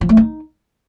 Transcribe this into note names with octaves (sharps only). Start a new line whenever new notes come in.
F3
A3
D#4